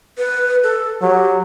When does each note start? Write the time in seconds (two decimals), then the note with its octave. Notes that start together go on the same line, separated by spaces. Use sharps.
0.18 B4
0.63 A4
1.02 F#3 G4